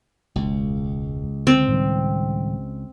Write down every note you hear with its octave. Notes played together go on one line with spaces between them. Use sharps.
E1 C#2 G#3
D3 C4
A2 D#3 G3